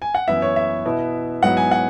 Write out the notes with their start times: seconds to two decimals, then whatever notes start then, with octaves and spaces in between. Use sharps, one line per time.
0.02 G#5
0.15 F#5
0.28 F#2 E3 B3 E4 E5
0.42 C#5
0.56 E5
0.85 B2 B3 E4
1.43 G#2 F#3 B3 E4 F#5
1.57 G#5
1.71 F#5